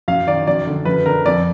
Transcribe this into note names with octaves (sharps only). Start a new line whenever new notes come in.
F#2 F5
D#3 D5
F#2 D5
D3
F#2 B4
D3 A#4
F2 D5